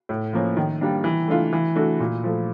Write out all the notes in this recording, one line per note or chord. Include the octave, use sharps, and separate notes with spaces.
A2
F3 A#3 C#4
D#3
G3 A#3 D4
E3
A3 D4 F4
E3
A3 D4 F#4
A#2
F3 A3